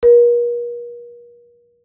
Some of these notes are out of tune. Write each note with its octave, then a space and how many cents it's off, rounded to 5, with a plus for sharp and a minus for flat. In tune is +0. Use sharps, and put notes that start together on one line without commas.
A#4 +45